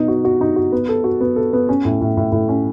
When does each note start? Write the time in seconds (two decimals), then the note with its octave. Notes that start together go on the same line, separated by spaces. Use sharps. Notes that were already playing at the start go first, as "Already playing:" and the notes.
Already playing: B2 D#4
0.08 F#4
0.25 F#4
0.41 D#4
0.56 F#4
0.72 B3
0.89 A4
1.04 F#4
1.21 B3
1.36 A4
1.53 B3
1.69 C#4
1.85 A2
2.01 A2
2.17 A2
2.32 A2
2.49 C#4